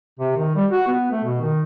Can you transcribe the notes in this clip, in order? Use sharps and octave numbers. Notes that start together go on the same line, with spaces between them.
C3
D#3
G3
F#4
B3
A3
B2
D#3